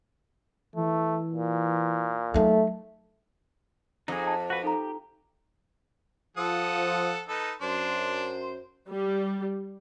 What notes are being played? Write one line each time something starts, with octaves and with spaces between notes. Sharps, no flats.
E3 A3
A#2
F#3 A3 D#4
F2 D#4 G#4
A5
F#4 B4 F5
D#4 G4 A4 A#5
F3 A4 F#5 D#6
D#4 A4 B4
F#2 D4 C5 C6
G3